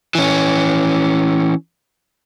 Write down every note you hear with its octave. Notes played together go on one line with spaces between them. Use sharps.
E3 C#4